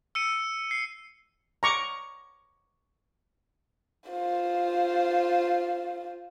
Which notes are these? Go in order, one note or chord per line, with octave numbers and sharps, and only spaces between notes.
E6 C#7 D#7
C7
A#5 C#6 D6
F4 C5